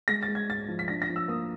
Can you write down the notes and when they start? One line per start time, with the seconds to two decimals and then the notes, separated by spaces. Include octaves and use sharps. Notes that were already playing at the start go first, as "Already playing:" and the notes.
0.08 G#3 A#6
0.23 A6
0.28 G#3
0.35 G#6
0.49 G#2 A6
0.68 F3
0.79 B6
0.88 D4 A#6
1.02 A#6
1.09 F3
1.16 E6
1.28 A#3 D#6